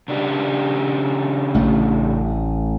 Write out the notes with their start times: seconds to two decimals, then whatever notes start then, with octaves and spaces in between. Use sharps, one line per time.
0.08 C#3 D4 G4
1.55 A1 A3